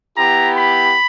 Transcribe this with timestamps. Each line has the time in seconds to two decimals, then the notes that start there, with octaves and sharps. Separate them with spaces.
0.17 B3 E4 G4 A#5
0.56 B5